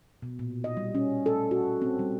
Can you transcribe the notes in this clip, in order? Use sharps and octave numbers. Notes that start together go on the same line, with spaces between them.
B2
A#2
D#5
G3
C#4
A4
F#4
C4
G3